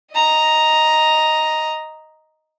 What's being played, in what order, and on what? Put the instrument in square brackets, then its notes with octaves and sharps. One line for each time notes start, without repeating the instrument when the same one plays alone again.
[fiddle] D#5 A#5